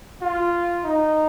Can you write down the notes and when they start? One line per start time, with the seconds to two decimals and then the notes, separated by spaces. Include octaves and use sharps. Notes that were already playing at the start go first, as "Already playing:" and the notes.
0.22 F4
0.84 D#4